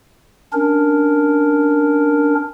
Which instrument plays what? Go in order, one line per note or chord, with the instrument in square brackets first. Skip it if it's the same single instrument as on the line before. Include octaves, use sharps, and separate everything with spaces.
[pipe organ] C#4 D4 A#4